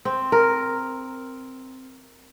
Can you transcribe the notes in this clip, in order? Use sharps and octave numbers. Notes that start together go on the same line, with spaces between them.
C4
A#4